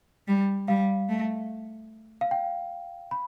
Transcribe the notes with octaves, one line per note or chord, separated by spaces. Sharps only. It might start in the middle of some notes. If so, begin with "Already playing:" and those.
G3
G3 F5
A3
F5
G5
B5